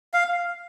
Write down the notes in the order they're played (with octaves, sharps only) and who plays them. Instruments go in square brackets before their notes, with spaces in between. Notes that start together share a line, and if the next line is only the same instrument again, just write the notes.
[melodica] F5